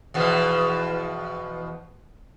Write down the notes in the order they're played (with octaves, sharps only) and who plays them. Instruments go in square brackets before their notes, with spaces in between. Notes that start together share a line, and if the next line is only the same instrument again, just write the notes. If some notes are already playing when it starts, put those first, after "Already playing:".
[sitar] E2 B2 F3